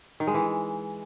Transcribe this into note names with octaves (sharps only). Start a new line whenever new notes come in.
D#3
G#3
E3